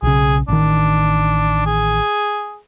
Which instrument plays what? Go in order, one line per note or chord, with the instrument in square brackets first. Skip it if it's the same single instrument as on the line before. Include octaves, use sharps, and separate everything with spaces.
[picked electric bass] B1 C#3 [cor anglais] G#4
[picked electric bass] A1 D#3 [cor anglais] D4
[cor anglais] G#4